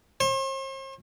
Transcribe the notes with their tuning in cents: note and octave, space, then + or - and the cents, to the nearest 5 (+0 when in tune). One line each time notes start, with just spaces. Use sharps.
C5 +45